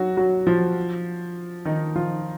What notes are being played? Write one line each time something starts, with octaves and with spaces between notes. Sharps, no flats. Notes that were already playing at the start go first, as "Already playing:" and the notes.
Already playing: F#3 F#4
F#3 F#4
F3 F4
D#3 D#4
F3 F4